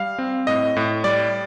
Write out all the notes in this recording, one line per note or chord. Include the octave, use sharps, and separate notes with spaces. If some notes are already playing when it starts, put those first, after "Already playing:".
Already playing: G3 F5
C4
A2 D#5
A2
G3 D5